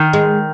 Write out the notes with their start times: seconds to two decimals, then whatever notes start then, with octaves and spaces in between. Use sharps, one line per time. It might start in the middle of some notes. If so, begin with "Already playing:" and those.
Already playing: D#3
0.13 G#3